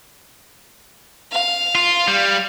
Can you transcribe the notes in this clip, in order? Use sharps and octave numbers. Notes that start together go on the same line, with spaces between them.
F5
F4
G3